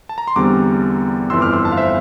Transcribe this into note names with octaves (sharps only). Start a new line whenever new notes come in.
A5
A#5
C6
E2 D3 G3 C4 A#5 D6
G1 F2 E3 C6 E6
D6 F6
C6 E6
A5 C6
F5
C5 E5